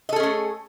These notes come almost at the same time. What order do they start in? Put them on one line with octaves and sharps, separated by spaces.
D#5 A4 G#4 C#4 A3